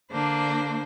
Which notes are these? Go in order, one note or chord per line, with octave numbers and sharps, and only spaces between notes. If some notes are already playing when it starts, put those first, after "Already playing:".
D3 A#3 D4 C5